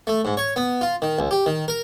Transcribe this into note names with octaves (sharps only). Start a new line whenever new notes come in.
A3
G#2
C#5
B3
F4
D#3
C#2
G4
D#3
A#4